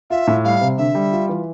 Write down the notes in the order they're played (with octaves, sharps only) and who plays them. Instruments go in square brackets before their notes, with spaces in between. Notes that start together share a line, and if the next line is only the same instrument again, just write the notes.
[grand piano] F4 [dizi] E5
[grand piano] A2
[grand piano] G3 [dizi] F5
[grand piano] C3
[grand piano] D3 [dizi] E5
[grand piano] G3
F4
E3